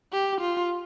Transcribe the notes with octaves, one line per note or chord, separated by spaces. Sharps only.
G4
F4